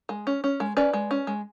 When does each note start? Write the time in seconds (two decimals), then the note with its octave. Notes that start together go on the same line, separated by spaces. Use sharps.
0.09 G#3
0.27 C#4
0.44 C#4
0.60 G#3
0.77 C#4 B4 D5
0.93 G#3
1.11 C#4
1.27 G#3